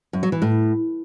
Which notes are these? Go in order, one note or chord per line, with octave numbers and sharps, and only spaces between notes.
F#2
F#3
E3
A2